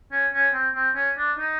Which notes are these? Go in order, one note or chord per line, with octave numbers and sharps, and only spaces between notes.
C#4
C#4
C4
C4
C#4
D4
D#4